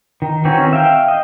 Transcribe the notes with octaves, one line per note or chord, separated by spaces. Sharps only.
D#3
D#3 E3 C4 C#4 F#4
E5 F5 G5
D#5